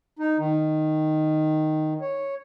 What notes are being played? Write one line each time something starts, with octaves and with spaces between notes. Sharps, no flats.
D#4
D#3
C#5